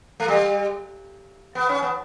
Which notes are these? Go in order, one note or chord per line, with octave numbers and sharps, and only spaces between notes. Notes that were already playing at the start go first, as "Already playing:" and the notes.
A3
G3
B3
C#4
B3